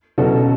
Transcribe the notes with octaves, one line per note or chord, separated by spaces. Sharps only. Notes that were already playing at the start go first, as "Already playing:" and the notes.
B2 F#3 C#4 F#4 A4